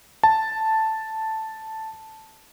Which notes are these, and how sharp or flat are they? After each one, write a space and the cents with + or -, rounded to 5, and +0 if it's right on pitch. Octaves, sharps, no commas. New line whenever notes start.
A5 +0